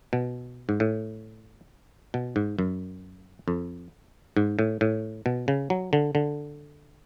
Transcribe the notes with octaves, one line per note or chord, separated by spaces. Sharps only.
B2
G#2
A2
B2
G#2
F#2
F2
G#2
A2
A2
B2
C#3
F#3
D3
D3